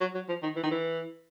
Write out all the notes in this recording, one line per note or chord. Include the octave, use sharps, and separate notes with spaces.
F#3
F#3
F3
D#3
E3
D#3
E3